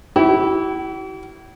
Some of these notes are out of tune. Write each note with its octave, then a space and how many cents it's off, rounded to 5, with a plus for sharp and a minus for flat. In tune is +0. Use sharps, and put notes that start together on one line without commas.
E4 -5 G4 -45